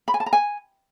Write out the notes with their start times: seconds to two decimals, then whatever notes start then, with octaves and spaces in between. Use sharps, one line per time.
0.08 B5
0.14 G#5
0.20 A5
0.26 A#5
0.33 G#5